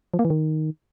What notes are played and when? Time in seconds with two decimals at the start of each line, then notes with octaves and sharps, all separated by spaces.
0.14 F3
0.19 A#3
0.25 E3
0.30 D#3